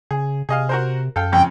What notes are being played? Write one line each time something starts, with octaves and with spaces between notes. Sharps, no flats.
C#3 G#4
C3 G#4 D#5 F5
F#4 A#4 C5
F#2 A4 F5 G5
F2 C#3 G5